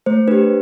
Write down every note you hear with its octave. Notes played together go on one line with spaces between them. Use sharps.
A3 C5
D4 G4 B4